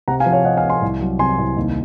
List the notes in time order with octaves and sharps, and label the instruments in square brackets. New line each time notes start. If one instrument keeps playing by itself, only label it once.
[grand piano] C3 F#5 A#5
F5 G#5
F3
C#5 F5
C3 D#5 F#5
F5 G#5
C3
G#5 C6
C2
F#3
C3 G#5 C6
C2
D#2